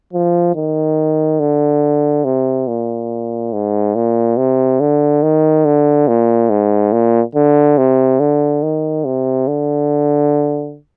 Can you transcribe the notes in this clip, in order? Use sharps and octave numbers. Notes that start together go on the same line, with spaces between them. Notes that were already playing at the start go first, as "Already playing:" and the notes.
F3
D#3
D3
C3
A#2
G#2
A#2
C3
D3
D#3
D3
A#2
G#2
A#2
D3
C3
D3
D#3
C3
D3